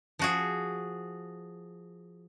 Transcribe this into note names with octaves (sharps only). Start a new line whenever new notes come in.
F3 F#4 G#4